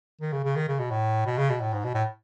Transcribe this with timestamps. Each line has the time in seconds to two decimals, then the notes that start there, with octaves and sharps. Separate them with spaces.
0.21 D#3
0.33 C#3
0.44 C#3
0.56 D#3
0.68 C#3
0.79 B2
0.91 A2
1.26 B2
1.37 C#3
1.50 B2
1.61 A2
1.73 G#2
1.84 B2
1.94 A2